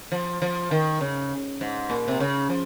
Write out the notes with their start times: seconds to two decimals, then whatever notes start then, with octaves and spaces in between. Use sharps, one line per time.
0.12 F3
0.42 F3
0.71 D#3
1.01 C#3
1.61 G#2
1.90 A#2
2.08 C3
2.20 C#3
2.50 F3